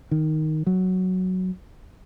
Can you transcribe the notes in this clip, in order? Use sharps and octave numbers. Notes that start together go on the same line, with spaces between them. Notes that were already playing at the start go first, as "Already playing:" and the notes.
D#3
F#3